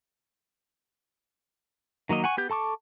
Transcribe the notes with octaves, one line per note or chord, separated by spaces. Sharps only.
D#3 F#3 A#3 D#5
F#5 G#5 C#6
B3 G4 G6
A4 A5 C#6 D6